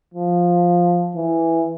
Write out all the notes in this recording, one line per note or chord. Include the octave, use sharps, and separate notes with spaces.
F3
E3